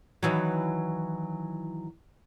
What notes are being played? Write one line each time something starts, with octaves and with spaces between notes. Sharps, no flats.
D#3 E3 F#3